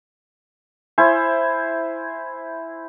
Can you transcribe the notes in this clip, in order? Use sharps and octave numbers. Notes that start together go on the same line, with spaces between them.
E4 C5 G#5